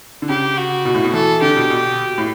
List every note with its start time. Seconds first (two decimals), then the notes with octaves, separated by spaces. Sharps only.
0.22 D3
0.29 C#3 G4
0.57 F#4
0.85 B2
0.95 A2
1.04 B2
1.14 E3 A4
1.42 D3 G4
1.57 B2
1.70 B2
2.18 A2